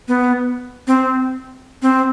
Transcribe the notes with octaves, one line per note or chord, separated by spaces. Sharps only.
B3
C4
C4